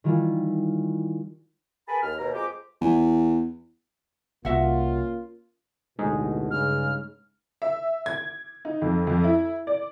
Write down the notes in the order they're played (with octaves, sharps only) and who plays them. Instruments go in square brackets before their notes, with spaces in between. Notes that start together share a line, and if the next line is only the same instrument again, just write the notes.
[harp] D#3 E3 G3 F4
[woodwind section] G#4 A#4 B4 G#5 A5 B5
D#2 F6
D#2 B2 A#5
F2 G#3 G4 D6
[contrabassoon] E2
[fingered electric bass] C2 [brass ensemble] A#3 C#4 F4 [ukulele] F#4 E5 F#5
[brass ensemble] A1 D2 B2 [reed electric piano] G#3 D#4 G#4
[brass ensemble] G2 C#3 [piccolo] F6
[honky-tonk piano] E5
G#6
D#4
F2
F2
E4
D5